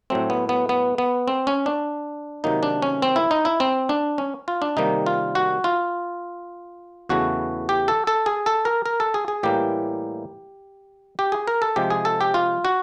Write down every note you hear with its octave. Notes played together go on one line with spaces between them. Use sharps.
A2 F#3 A3 C4
B3
B3
B3
B3
C4
C#4
D4
C3 D#3 F#3 A#3 D#4
D4
C#4
C4
E4
D#4
E4
C4
D4
C#4
F4
D4
C3 D#3 G3 A#3 D#4
F4
F#4
F4
E2 C#3 E3 A3 F#4
G4
A4
A4
G#4
A4
A#4
A#4
A4
G#4
G#4
A2 E3 G3 A#3 G4
G4
G#4
A#4
A4
C3 F3 G#3 G4
G#4
A4
G4
F4
F#4